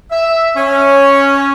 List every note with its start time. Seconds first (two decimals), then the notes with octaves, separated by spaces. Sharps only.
0.11 E5
0.56 C#4